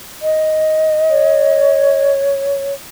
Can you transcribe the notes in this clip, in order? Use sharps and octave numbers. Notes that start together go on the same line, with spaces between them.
D#5
C#5